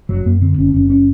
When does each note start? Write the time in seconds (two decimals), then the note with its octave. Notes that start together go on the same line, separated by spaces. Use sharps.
0.09 F#1 F#3
0.25 F#2 A#3
0.42 D3 C4
0.58 F#1 C#4
0.74 F#1 C#4
0.90 C#4